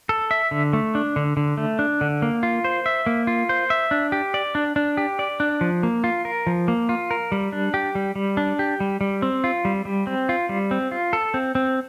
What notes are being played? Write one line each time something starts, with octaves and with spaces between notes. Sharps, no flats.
A4
E5
D3
A3
D4
D3
D3
A3
D4
D3
A#3
F4
C5
E5
A#3
F4
C5
E5
D4
G4
D5
D4
D4
G4
D5
D4
F3
A#3
F4
A#4
F3
A#3
F4
A#4
G3
D4
G4
G3
G3
D4
G4
G3
G3
C4
F4
G3
G3
C4
F4
G3
C4
F4
A4
C4
C4